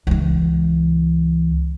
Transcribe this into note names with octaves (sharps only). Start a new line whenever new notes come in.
C#2 E3